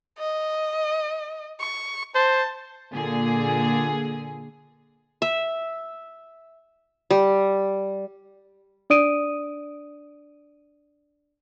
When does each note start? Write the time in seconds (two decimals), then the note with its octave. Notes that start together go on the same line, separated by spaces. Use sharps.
0.19 D#5
1.60 C#6
2.15 C5 A5
2.92 A#2 D3 G#4
5.22 E5
7.11 G3
8.90 D4 D5 D#6 D7 D#7